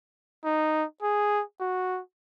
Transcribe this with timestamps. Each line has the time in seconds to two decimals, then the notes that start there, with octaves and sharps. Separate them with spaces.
0.45 D#4
1.02 G#4
1.60 F#4